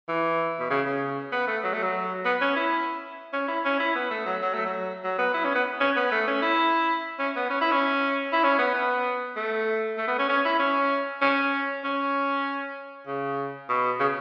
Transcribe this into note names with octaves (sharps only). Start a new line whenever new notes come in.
E3
B2
C#3
C#3
B3
A3
F#3
A3
F#3
B3
C#4
E4
C#4
E4
C#4
E4
B3
A3
F#3
F#3
A3
F#3
F#3
B3
E4
C#4
B3
C#4
B3
A3
C#4
E4
C#4
B3
C#4
E4
C#4
E4
C#4
B3
B3
A3
A3
B3
C#4
C#4
E4
C#4
C#4
C#4
C#3
B2
C#3